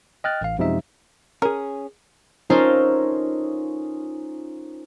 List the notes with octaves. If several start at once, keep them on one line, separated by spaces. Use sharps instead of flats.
D#5 G5 F6 F#6 A6
A1 F5
F#2 C3 F3 G#3 D#4 E5
C#4 G#4 A#4
C#4 D#4 F4 A4 A#4 C5